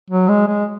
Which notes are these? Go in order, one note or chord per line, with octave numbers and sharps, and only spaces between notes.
F#3
G#3
G#3